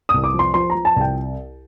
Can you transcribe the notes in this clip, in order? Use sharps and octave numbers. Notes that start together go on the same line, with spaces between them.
C2 D#6
D6
F3
C6
F3 C6
A#5
F3
A5
C2 G5